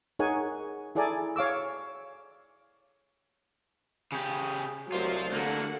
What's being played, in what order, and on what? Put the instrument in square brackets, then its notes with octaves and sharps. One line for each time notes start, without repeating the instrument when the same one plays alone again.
[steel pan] D#4 G#4 A#4 C#5 F#5 G#5
E4 G#4 A4 D5 G#5 A#5
C#5 F5 D6 E6
[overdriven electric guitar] C#3 G4 [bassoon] G#4
[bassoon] C2 [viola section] F#3 A3 [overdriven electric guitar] F4 C5
[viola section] D3 F#5 [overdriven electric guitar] A3 A#3